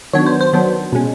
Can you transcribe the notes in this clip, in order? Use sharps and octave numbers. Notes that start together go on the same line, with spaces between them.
D#3 F#3 B3 D4 C#5
C5
C5
D#3 F#3 B3 D4
B2 G#3 C#4